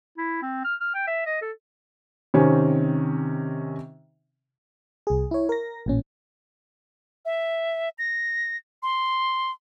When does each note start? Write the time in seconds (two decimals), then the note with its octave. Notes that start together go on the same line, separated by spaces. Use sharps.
0.18 E4
0.42 C4
0.65 F6
0.81 F6
0.95 G5
1.07 E5
1.26 D#5
1.42 A4
2.34 C3 D#3 C4 C#4
5.07 C2 G#4
5.31 E4 C#5
5.49 A#4 A#6
5.86 A1 A#2 C#4
7.25 E5
7.99 A#6
8.83 C6